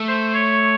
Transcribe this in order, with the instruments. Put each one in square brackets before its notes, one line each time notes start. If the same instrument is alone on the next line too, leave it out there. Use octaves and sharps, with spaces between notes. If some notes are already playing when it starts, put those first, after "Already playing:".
Already playing: [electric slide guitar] A3
[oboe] C5
C#5